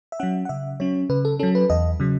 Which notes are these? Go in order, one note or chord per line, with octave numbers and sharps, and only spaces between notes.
E5
F#3 C#4 F#5
F#5
C#3 E5
F#3 C#4 C#5
C#3 B4
A4
F#3 C#4 A4
B4
E2 D#5
C#3 F#3